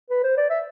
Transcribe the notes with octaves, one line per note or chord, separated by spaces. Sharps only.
B4
C5
D5
E5